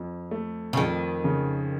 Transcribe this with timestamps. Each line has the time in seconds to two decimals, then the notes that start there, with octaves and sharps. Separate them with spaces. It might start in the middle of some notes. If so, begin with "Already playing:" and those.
Already playing: F2
0.31 A3
0.73 C#3
0.77 F2 D#3
1.24 C#3